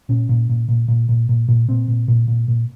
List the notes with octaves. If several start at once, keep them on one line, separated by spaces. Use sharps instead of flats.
A#2 C#4
A#2
A#2
A#2
A#2
A#2
A#2
A#2
A#2 C4
A#2
A#2
A#2
A#2